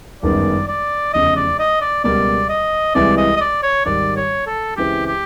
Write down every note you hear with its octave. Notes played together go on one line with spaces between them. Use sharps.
G1 F#2 D#3 G#3 B3 D5
D5
F1 E2 C#3 D#5
D5
D#5
D5
C#2 B2 G3 A#3 D5
D#5
C2 C3 E3 G#3 D5
D#5
D#5
D5
C#5
G#1 G#2 D#3 G3 D5
C#5
A4
C#2 C#3 E3 G#3 C4 G4
G4